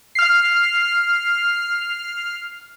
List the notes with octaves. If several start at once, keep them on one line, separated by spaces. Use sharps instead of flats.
F6 C7